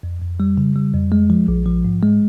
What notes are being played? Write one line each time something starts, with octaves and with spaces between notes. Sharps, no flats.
F2
F2
G3
C#3
G3
F2
G#3
F3
A#1
F3
G#2
G#3